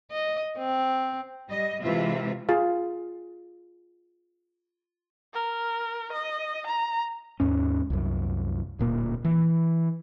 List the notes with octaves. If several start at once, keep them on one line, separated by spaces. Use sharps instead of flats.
D#5
C4
G3 D#5
C3 E3 G#3 F4 E5
F4 G#4 F5
A#4
D#5
A#5
D#2 G#2 C#4
C2 F#2
D1 A#2 A#3
E3